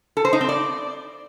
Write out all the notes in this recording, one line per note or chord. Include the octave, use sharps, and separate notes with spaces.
A4
C5
D#4
C4
D5